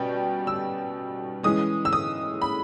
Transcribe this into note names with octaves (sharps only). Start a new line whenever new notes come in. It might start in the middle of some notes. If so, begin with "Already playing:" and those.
Already playing: B2 G3 C#4 G5
E6
E3 G#3 C#4 D#6
E6
D#6
B5